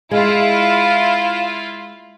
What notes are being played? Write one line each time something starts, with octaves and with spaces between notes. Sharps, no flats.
G#3 E4 F4 F5